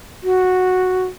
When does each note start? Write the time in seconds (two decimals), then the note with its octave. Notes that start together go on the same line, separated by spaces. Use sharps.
0.23 F#4